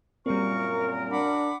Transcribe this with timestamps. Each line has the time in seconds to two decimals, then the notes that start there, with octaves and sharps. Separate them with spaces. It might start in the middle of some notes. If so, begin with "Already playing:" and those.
0.26 F#2 A#2 G3 A#3 C4 A#4 C#6
1.10 D4 F#5 B5 D6